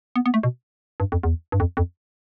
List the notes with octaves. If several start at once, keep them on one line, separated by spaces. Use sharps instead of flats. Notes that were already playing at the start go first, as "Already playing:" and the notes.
B3
B3
A3
B2
G2
F2
E2
G2
F2
F2